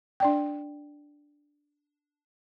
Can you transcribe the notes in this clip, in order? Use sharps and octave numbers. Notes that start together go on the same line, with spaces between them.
D4 D5 G5